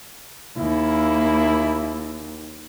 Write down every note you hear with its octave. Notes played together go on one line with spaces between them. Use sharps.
D#2 A#3 E4